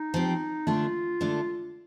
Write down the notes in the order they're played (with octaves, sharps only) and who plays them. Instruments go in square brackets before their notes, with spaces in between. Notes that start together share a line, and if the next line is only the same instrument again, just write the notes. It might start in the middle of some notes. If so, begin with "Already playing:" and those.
Already playing: [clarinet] D#4
[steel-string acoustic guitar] F3 C4 G4
[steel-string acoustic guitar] D3 A3 D4 [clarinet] F4
[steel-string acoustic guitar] D3 A3 D4